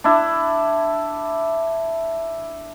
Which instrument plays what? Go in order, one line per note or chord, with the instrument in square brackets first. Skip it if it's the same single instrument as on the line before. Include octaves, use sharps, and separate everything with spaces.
[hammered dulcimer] D4 E4